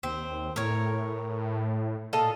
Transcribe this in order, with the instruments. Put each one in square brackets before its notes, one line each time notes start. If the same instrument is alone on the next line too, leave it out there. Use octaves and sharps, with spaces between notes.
[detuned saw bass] D#2 [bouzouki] C4
[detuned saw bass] A2 [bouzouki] A#4 C#5
[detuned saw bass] A#2 [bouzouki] A4 D#5 F5